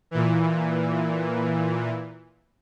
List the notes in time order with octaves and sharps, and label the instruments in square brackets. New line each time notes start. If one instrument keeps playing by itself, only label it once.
[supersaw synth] A#2 E3